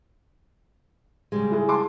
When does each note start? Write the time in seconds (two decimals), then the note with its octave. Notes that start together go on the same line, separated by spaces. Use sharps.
1.32 C#3 G3 G#3
1.51 E4 G#4
1.69 A5 C6 D6